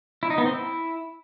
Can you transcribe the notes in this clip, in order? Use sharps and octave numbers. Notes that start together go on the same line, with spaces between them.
E4
D#4
B3
C4
E4